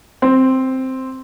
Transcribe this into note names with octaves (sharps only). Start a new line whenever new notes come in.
C4